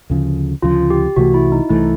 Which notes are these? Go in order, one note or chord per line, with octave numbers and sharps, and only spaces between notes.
D2 C#3 F3
D2 C#3 F3 F4
G4
C2 C3 E3 A3 F#4
E4
D#4
C2 C3 E3 A3 E4